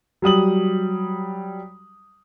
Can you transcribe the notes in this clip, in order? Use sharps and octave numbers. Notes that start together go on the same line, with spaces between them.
F#3 G3 D#6 F#7